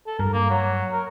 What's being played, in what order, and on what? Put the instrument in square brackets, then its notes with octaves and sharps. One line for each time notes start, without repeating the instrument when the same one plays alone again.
[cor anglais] A4
[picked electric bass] G2 [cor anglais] A#4
[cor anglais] A#3
F#3
A#4